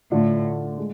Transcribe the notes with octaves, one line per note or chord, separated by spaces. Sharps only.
A2 D3 A3 D4 F4
G#3